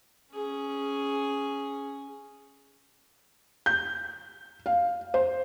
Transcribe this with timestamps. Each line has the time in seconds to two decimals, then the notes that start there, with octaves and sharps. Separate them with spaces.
0.34 C#4 G#4
3.66 G6
4.66 F5
5.14 C5